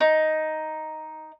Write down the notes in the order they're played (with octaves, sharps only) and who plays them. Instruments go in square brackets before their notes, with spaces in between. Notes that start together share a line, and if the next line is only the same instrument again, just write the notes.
[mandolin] D#4